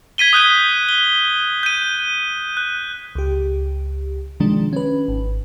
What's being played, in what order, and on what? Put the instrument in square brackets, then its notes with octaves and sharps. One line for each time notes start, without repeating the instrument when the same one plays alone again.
[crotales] G#6 B6 D#7 G7
D#6 F#6 G6 D#7
G7
G6 D#7
F#6
[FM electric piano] C#2 G4
C3 D#3 F3 G#3 D4
C#4 B4
G#1